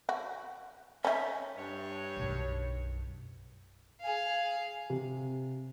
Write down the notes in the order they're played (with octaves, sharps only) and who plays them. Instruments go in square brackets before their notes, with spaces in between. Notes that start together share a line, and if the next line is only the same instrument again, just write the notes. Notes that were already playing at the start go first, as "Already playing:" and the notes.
[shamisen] F#4
[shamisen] C#4 D#4 [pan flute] E5
[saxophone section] G2 C#5
[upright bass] B1 F#2
[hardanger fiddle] G#4 F5
[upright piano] C3